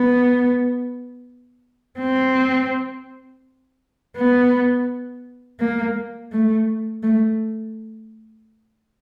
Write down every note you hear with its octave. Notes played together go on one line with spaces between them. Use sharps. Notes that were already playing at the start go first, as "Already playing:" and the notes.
Already playing: B3
C4
B3
A#3
A3
A3